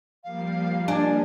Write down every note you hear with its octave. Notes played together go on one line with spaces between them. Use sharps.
F3 G3 A#3 F5
D4 G#5